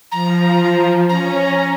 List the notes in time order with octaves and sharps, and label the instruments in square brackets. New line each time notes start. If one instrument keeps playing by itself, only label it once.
[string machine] F3 [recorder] A#5
[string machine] C#4 [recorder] A#5